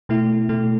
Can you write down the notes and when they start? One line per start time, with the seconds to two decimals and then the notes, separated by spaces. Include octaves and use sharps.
0.09 B2 A3 E4
0.49 B2 A3 E4